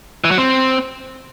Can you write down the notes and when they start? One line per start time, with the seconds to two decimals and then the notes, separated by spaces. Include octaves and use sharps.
0.24 E3
0.31 F#3
0.38 C4